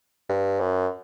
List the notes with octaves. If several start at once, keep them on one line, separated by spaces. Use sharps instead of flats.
G2
F#2